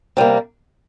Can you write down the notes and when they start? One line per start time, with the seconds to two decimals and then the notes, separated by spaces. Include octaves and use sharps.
0.17 C3 G3 A#3